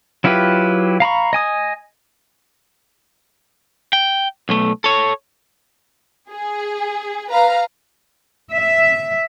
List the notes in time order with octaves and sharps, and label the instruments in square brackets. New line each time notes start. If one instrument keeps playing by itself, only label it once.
[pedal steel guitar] F#3 E4 F4 G4 B4
F5 A#5 B5 C#6
D#5 G#5 D#6
[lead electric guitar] G5
B1 A3
A4 C#5
[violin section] G#4
B4 F5 A#5
[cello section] E5